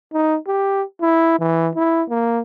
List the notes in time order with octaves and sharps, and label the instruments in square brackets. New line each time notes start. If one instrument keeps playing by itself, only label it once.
[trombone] D#4
G4
E4
E3
E4
A#3